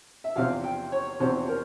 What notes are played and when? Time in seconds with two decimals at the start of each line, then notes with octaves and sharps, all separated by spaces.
0.24 E5
0.36 E2 C3 F3 F5
0.64 G5
0.92 C#5
1.20 E2 C3 F3 C5
1.48 A#4